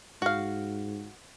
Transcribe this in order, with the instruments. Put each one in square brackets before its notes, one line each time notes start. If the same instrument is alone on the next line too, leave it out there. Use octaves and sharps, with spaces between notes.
[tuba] G#2 [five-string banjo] F#4 F5